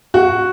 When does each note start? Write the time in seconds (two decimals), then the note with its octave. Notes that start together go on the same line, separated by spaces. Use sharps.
0.14 F#4